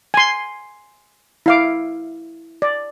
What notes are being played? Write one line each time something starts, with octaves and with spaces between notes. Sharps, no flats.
G#5 C6
E4 F5 D6
D5